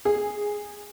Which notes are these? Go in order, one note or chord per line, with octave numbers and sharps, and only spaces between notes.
G#4